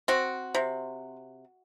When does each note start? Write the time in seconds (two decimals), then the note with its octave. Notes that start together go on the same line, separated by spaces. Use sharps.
0.08 C4 F#4
0.55 C3